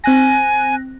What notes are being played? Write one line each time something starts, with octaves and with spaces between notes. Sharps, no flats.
C4 G#5 F#6 A#6